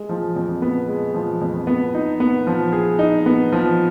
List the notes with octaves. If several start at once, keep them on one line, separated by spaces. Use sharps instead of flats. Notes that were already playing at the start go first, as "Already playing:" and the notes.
Already playing: G#3
F3
F2
B3
G#3
F3
F2
B3
D#4
B3
F3
G#4
D#4
B3
F3